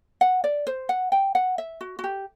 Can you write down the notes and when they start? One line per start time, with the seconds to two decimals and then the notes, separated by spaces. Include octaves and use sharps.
0.21 F#5
0.44 D5
0.67 C5
0.89 F#5
1.12 G5
1.35 F#5
1.58 E5
1.81 F#4
1.99 F#4
2.04 G4